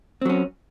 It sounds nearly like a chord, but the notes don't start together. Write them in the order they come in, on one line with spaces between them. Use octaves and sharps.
C4 F#3 C#4